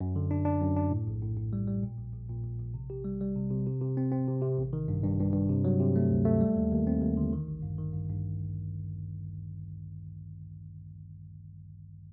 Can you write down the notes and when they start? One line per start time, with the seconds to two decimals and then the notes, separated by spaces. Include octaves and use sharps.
0.01 F#2
0.16 D3
0.31 D4
0.45 D4
0.61 F#2
0.76 D4
0.91 A2
1.07 A#1
1.22 A2
1.37 A2
1.53 G3
1.68 G3
1.83 A#2
1.98 A#1
2.13 A#1
2.29 A#2
2.45 A#1
2.59 A#1
2.74 C3
2.90 G4
3.04 G3
3.21 G3
3.36 C3
3.50 C3
3.67 C3
3.81 C3
3.97 C4
4.12 C4
4.28 C3
4.42 C3
4.58 A1
4.73 D#3
4.88 G2
5.03 G2
5.19 G2
5.34 G2
5.49 C3
5.65 F#3
5.80 C3
5.96 A3
6.11 D2
6.25 A3
6.41 G3
6.56 D#2
6.72 D#2
6.87 C4
7.01 D#2
7.17 D3
7.33 D#3
7.48 A1
7.63 G2
7.78 D#3
7.93 G2
8.09 G2